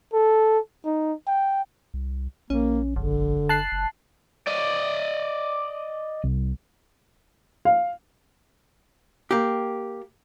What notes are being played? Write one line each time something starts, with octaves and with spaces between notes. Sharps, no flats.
A4
D#4
G5
C2
A#1 A#3 C#4
F#1 D3
A5 F#6 C7
F#1
D5 D#5
C2
F5
A#3 G4